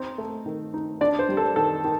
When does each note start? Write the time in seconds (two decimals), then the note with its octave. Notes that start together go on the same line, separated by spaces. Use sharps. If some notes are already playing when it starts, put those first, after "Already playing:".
Already playing: C4 D#4
0.18 A3
0.46 D#3
0.74 D#4
1.01 D4 D5
1.19 C5
1.29 G3
1.37 A4
1.56 D#3 A4
1.84 D#3